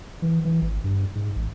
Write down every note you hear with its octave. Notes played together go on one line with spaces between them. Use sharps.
E3
E3
G#1
G2
G#2
A1